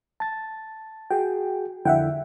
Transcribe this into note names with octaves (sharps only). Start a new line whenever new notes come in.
A5 A6
F#4 G#4 G5
F2 D3 E4 E5 F#5 G5